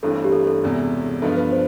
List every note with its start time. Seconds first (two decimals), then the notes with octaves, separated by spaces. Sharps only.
0.03 G1 G2 E3 A3 C4 A4
0.24 G4
0.32 A4
0.47 A4
0.63 E1 E2 C3
1.22 G2 F3 B3 F4 A4
1.37 B4
1.52 C5